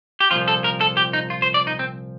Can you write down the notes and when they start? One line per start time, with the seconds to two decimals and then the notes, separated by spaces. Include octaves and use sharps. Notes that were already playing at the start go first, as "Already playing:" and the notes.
0.20 G4
0.31 C2 A#2 F3 F4
0.48 A4
0.64 A#4
0.81 A4
0.97 G4
1.13 D#4
1.30 F4
1.42 C5
1.54 D5
1.67 D#4
1.79 C4